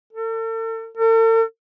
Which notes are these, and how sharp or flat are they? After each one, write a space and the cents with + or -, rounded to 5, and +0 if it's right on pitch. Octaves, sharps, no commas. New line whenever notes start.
A4 +40
A4 +45